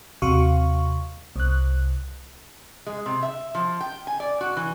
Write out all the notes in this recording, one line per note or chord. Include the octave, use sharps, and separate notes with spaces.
D#2 C3 F#4 F5 C#6
C2 F#6
G#3
C3
E5
F3
G5
G#5
D5
F#4
E3